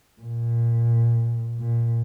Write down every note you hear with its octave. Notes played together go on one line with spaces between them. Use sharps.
A#2
A#2